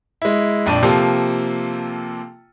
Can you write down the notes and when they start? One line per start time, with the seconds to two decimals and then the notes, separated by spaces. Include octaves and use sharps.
0.22 G#3 E4
0.66 A#1 F2 D4 D#7
0.83 C3 F3 A#3 F4 A4